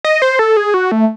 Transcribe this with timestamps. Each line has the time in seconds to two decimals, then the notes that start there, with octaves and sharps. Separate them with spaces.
0.04 D#5
0.22 C5
0.39 A4
0.57 G#4
0.74 F#4
0.92 A3